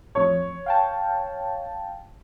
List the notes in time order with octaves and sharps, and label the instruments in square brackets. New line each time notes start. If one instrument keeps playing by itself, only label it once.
[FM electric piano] A1 F2 [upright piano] C#5
[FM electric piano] F5 G5 A5